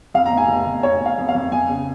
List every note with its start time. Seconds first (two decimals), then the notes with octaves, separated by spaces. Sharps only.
0.14 F2 F5
0.26 A#5
0.31 F1
0.37 G#5
0.48 F1
0.66 F1
0.83 F1 C#5
1.01 F1
1.06 F5
1.18 F2
1.29 F5
1.35 F2
1.52 F2 G#5
1.69 C#3